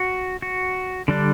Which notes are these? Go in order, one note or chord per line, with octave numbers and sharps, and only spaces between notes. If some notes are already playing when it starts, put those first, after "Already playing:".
Already playing: F#4
F#4
D3 G3 D4